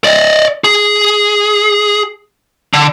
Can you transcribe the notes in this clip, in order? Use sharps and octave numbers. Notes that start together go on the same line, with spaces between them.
D5 D#5
G#4
D3